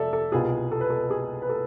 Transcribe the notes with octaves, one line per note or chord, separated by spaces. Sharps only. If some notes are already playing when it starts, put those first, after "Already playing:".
Already playing: F1 A4 D5 E5
A4
C2 B2 B3 F4 G#4
A4
B4
A4
G#4
B4
A4